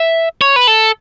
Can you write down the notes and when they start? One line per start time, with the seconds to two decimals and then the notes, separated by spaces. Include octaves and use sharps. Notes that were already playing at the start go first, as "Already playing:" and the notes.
Already playing: E5
0.41 C#5
0.56 B4
0.67 A4